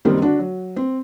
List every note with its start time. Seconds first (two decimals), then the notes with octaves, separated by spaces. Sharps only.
0.05 C#2 F#2 D#3 G3 A#3 C4
0.20 D3 D4 F#4
0.39 F#3
0.76 C4